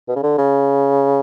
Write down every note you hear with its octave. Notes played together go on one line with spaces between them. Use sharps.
B2
C#3
D3
C#3